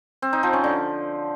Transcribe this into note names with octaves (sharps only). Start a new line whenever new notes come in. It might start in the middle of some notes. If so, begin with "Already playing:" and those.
C4
D#4
F3
C#4
D3